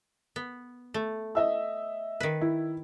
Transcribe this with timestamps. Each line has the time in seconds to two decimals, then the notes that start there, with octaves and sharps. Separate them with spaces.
0.36 B3
0.94 A3
1.35 D#5 E5 E6
2.20 D#3 B4
2.41 E4